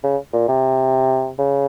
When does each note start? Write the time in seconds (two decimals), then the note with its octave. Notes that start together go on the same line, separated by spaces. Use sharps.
0.03 C#3
0.33 A#2
0.48 C3
1.39 C#3